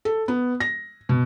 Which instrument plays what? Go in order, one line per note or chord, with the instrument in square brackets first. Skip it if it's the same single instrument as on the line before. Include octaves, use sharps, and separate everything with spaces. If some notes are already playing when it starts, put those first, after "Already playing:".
[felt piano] A4
B3
A#6
B2